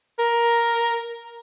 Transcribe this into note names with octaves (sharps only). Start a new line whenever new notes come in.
A#4